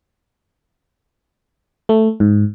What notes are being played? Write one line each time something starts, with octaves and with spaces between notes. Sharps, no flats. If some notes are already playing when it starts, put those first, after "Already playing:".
A3
G#2